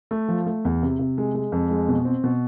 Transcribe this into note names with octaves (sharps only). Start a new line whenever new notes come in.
A3
F3
A3
E2
C3
C3
G#3
G#3
F2
G#3
B2
C4
B2